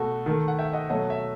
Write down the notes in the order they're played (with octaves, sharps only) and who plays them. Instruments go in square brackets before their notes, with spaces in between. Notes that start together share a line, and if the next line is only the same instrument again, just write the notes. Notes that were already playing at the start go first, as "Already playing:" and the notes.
Already playing: [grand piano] B2 A3 F#4 A4
D#3 A3
F#5
E5 G5
D#5 F#5
B2 F#3 A3 D#5 F#5
E5